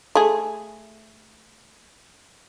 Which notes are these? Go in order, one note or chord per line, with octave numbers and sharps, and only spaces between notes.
A3 G#4